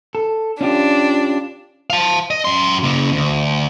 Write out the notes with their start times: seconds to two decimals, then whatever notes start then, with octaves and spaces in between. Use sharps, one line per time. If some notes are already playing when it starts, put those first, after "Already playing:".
0.15 A4
0.61 C#4 D4 F4 G4
1.90 F5 A5
2.30 D#5
2.45 F#2 C6
2.83 C#3 A#3
3.12 D2